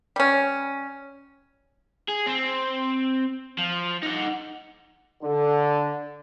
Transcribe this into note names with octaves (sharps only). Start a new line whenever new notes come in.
G3 C#4
G#4
C4
F3
D#4 F#5
D3